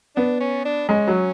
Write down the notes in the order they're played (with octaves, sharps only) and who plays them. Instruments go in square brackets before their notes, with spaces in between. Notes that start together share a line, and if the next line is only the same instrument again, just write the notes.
[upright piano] B3 [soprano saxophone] D4
[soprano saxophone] C#4
D4
[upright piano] G#3 [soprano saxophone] C#4
[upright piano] F#3